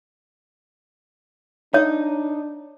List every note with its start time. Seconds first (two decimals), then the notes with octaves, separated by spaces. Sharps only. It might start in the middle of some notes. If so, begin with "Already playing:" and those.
1.74 D4 D#4 C#5